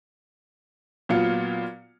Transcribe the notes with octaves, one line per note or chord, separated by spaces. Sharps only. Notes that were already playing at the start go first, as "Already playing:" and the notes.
A#2 F#3 B3 F4 F5 C#7